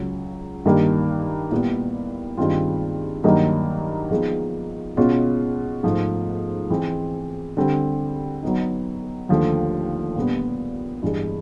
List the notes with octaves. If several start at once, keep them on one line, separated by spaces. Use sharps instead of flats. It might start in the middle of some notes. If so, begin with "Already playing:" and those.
Already playing: C#2 C#3 F#3
G2 D#3 G3 A#3
A#2 G3 B3 E4
G2 D#3 G#3 C4 F4
G2 D#3 F#3 A#3 D#4
F3 G#3 B3 D#4 G#4
B2 G#3 C#4 F4
G#2 F3 A3
E3 G#3 C4
D3 G3 C4
F#3 B3 D#4
D#2 D3 F3 A3
A#2 G3 B3 D4
G2 E3 G#3